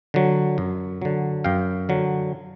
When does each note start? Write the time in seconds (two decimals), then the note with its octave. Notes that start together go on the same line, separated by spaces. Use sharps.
0.14 D3 F#3
0.58 F#2
1.02 D3 F#3
1.44 F#2 F5 G5
1.89 D3 F#3